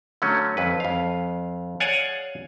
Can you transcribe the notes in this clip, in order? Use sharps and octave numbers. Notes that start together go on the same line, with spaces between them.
D3 F#3 A3 C#4
F2 B4
F2 F5
G#4 C#5 D5 F5 F#5 G#5